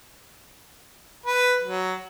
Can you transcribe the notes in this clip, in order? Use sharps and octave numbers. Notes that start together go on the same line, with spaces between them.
B4
F#3